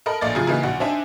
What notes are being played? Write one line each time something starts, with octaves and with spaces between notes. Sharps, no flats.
A4 A#4 D#5 B5
A#1 A3 A#3 D5 D#5 A6
C#3 F#3 F4 G#4
C#3 E3 A#3 D#4
A#1 F#4
C4 D4 D#4 C5 E5 G#5